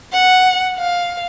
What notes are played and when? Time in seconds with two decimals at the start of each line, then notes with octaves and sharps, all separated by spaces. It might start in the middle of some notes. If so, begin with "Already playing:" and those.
0.13 F#5
0.78 F5